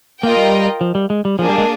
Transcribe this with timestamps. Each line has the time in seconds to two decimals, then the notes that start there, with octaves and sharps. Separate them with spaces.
0.23 A#3 F4 A#4 D#5 G5
0.37 G3
0.81 F3
0.95 G3
1.10 G#3
1.25 G3
1.39 F3 A#3 D4 G#4
1.49 G3
1.58 G#3